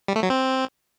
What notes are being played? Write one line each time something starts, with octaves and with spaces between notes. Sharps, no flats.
G3
A3
F#3
C4